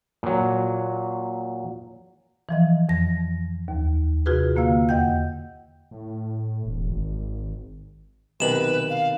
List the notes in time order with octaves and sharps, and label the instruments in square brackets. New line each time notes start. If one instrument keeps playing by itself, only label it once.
[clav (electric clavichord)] A#2 F#3
[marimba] E3 F3 D#5
F2 A#6
D#2
C3 F4 F#4 G#4 B4
D3 A#3 F5 E6
E2 D#5 F#5 G5 G6
[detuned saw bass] A2
E1
G#1
[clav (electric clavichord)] B1 C3 D#3 [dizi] B4 [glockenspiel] E7 F#7
[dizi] F5